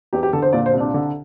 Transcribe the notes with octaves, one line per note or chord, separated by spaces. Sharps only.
E2 G4
G4
D3 A4
C5
A#2 D5
C5
C2
D4
D3